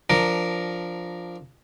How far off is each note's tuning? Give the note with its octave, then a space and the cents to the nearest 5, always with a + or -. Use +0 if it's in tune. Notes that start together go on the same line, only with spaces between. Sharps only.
F3 +0 D4 +0 A#4 +0